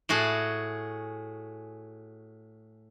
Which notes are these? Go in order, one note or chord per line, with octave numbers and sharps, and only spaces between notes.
A2 F#4 G#4 A5